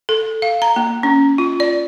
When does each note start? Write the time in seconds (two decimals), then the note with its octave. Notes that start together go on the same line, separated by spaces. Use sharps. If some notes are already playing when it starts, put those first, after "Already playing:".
0.09 A4
0.42 F5
0.62 A#5
0.76 A#3
1.03 C#4
1.38 F4
1.60 D5